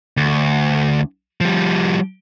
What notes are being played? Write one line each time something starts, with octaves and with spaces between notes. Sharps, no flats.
D2
F3 G3